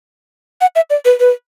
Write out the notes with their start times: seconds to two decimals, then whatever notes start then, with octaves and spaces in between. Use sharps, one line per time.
0.61 F#5
0.75 E5
0.90 D5
1.05 B4
1.20 B4